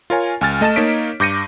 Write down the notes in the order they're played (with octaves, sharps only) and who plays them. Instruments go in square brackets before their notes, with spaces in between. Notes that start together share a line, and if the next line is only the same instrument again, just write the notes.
[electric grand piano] F4 A#4 C#5 G#5
C#2 G#5 F6 A6
A3 D#5 A5 A6 E7
A#3 D#4 C#5 D#5 B6 D7
G2 D6 G6 A#6 C#7 D#7